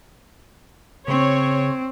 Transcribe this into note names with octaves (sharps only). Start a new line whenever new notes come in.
C#3 C4 C#5